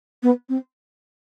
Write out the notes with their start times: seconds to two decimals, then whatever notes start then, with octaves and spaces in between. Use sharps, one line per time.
0.22 B3
0.49 C4